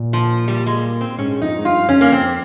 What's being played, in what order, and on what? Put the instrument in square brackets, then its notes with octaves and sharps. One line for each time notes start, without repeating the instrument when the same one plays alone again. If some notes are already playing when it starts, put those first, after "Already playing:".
Already playing: [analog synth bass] A#2
[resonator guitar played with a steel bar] F3
G3
G#3
C4
[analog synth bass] G#2 [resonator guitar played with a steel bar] C#4
[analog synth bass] F2 [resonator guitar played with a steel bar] D#4
[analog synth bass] G#2
[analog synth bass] G2 [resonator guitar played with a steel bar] F4
[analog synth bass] F2 [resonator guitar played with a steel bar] C#4
[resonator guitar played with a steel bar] A#3
C4